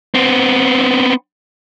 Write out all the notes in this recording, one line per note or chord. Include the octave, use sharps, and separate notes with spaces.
B3 C4